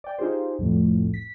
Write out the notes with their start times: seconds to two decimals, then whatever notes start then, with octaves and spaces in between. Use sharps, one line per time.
0.04 D5 G5
0.18 D#4 F4 G4 G#4 C5
0.59 C2 F2 A2
1.14 B6